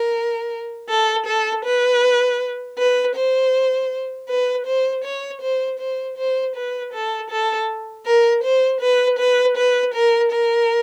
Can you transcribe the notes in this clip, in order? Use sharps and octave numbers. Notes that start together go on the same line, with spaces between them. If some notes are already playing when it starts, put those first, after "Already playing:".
Already playing: A#4
A4
A4
B4
B4
C5
B4
C5
C#5
C5
C5
C5
B4
A4
A4
A#4
C5
B4
B4
B4
A#4
A#4